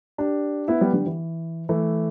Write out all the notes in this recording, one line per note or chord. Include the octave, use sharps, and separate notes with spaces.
D4 G4
B3 E4
G3 B3
D3 G3
E3
E3 A3